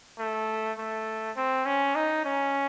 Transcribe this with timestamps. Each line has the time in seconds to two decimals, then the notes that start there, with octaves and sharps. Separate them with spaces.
0.19 A3
0.78 A3
1.37 C4
1.66 C#4
1.95 D#4
2.25 C#4